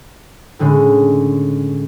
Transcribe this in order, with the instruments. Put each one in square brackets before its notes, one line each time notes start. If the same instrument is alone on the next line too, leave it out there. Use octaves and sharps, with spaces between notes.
[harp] A2 D3 G#3 C#4